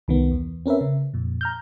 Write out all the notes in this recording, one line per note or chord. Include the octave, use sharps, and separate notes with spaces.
C2 D#3 B3
E2
C4 C#4 A#4 B4 E5
C#3
F2 A#2
A#5 F6 G6